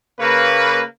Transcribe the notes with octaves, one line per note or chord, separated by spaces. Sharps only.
C#3 A#3 B4